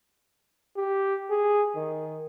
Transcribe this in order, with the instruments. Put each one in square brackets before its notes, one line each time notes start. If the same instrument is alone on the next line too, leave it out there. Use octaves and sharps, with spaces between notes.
[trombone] G4
G#4
D#3